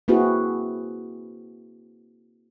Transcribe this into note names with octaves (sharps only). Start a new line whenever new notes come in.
A#3 C4 E4 F#4 G#4 B4